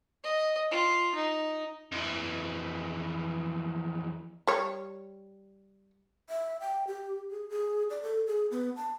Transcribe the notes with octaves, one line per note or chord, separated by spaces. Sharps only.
D#5
F4
D#4
F2 E3
G3 C#5
E5
G5
G4
G#4
G#4
D5
A4
G#4
B3
A5